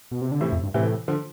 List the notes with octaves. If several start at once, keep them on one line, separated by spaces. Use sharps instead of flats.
B2
C3
D3
A2 C3 E3
F2
G2
A2 C3 E3
D3 F3